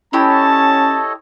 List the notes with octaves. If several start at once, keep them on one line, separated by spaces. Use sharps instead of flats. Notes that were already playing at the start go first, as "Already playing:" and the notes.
C#4 E4 G4 A4 C#5 D#5 A5